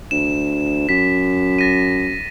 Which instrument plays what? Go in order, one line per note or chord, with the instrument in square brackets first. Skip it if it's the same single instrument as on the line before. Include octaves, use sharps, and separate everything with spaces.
[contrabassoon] D2 [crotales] E7
[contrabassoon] F#2 [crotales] B6
[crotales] A6 A#6 D#7